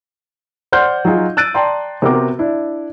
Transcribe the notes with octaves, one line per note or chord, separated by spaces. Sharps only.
C5 D5 F#5 C6 F6 G6
F#3 D#4 F4 G#4
E6 F#6 A6 D7 D#7
D5 G5 A5 A#5 C6
C3 B3 C4 F#4 A#4 D6
D4 E4